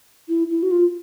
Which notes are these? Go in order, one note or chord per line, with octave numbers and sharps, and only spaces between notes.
E4
E4
F#4
F4